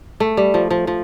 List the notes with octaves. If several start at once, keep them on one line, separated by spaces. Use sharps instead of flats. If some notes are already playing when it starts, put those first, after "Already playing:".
A3
G3
F3
F3
F3